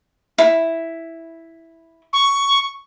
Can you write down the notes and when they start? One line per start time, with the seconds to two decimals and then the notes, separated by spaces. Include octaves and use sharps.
0.38 E4
2.13 C#6